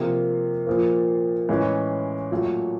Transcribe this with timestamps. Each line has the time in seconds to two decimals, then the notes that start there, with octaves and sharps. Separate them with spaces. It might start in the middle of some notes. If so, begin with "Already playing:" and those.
Already playing: C3 F3 A#3
0.66 A#2 F3 A#3
1.49 A2 E3 G#3 C#4
2.31 A#2 F#3 A3